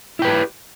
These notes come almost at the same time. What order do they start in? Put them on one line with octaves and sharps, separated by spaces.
E4 G5 B4 G4